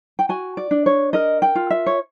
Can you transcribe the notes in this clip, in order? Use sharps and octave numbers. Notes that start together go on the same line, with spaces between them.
G5
F#4 G#5
D5
D4
C#5
A#4 D#5
G5
F4
E5
C#5